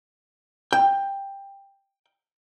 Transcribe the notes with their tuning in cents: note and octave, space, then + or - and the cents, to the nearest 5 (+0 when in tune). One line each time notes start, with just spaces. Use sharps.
G5 +10